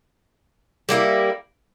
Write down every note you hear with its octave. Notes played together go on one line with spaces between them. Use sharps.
G3 A#3 E4